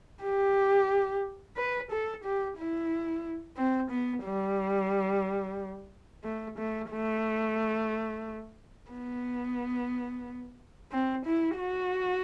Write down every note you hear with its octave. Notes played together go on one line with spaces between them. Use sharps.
G4
B4
A4
G4
E4
C4
B3
G3
A3
A3
A3
B3
C4
E4
F#4